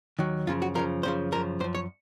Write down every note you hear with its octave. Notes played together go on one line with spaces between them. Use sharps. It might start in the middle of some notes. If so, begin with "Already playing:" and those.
D#2 D#3 F#3
F#2 C#3 F3 F4
F#4
F#2 C#3 F3 A#4
F#2 C#3 F3 C5
F#2 C#3 F3 A#4
F#2 F3 C5
C#5